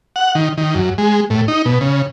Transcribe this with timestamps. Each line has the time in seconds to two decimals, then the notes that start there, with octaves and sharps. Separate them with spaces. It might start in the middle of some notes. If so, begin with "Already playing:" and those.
0.16 F#5
0.35 D#3
0.58 D#3
0.75 F#2
0.98 G#3
1.30 A2
1.48 D#4
1.65 B2
1.81 C#3